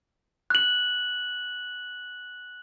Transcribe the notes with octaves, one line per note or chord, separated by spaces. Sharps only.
F#6 F#7